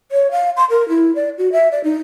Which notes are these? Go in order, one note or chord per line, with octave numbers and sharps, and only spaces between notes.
C#5
F5
C6
A#4
E4
D5
F#4
E5
D5
D#4